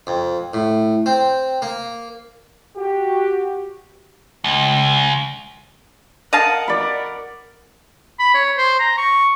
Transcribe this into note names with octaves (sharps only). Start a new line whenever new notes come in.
F2
A2
C4
A#3
F#4 G4
C#2
A#4 D#5 F5 F#5 A5
D5 B5
B5
C#5
C5
A#5
C#6